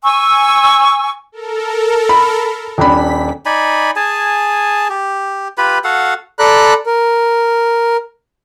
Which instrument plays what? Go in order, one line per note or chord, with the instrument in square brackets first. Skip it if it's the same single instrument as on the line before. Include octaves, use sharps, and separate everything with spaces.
[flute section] G#5 C#6 E6
[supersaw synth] A4 A#4
[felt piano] B5
[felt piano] D#1 D4 B5 [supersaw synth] B6
[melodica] D#4 D5 G#5 B5
G#4 G#5 A5
G4
F4 G4 B4 B5
F#4 A4 F5 F#5
[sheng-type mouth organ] A4 D5 A#5 B5 F#6
A#4